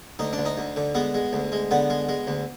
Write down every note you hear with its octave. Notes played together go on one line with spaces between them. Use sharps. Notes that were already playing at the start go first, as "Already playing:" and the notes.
D2 D#4
D4
D2
D#4
D2
D3
G#3 B3
G#3
D2
G#3
D3 B3
G#3
G#3
D2